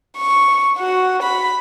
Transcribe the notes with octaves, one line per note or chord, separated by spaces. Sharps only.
C#6
F#4
B5